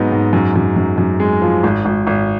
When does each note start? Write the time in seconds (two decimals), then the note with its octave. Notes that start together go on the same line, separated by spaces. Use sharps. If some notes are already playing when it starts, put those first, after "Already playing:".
Already playing: G#2 F#3 B3 D#4
0.12 G#2
0.33 F#2
0.56 F#2
0.76 F#2
0.98 F#2
1.20 G#3
1.42 F3
1.63 G#1
1.85 G#1
2.07 G#1